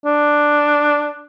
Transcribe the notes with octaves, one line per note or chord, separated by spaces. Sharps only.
D4